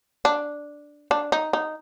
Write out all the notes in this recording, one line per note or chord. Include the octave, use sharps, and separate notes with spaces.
D4
D4
D#4
D#4